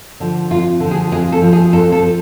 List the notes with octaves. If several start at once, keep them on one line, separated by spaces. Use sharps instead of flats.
D3 F3
F2 F4
D3
F3
G#4
F2 G#4
A4
F3
G#4
F2 A4
A4
F3